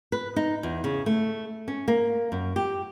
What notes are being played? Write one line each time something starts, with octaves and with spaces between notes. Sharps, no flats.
B4
D#4
E2
C#3
A3
C#4
A#3
F#2
G4